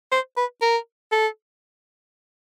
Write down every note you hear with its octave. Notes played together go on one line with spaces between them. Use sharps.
C5
B4
A#4
A4